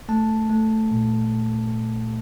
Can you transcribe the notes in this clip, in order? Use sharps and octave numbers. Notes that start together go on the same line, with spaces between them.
A3 A5
A3
A#2